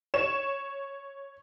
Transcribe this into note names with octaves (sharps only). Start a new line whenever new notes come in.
C#5 E7